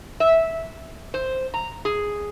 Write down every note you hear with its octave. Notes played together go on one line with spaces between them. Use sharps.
E5
C5
A#5
G#4